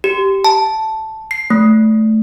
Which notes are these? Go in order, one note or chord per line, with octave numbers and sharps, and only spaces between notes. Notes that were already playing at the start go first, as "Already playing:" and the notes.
G4
A5
C7
A3